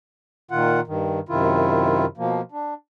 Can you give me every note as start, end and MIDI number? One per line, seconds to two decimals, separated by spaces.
0.51 0.80 46
0.51 0.80 51
0.51 0.80 65
0.51 0.80 78
0.87 1.20 43
0.87 1.20 51
1.29 2.06 42
1.29 2.06 48
1.29 2.06 51
1.29 2.06 64
1.29 2.06 65
2.17 2.41 47
2.17 2.41 53
2.17 2.41 58
2.52 2.74 62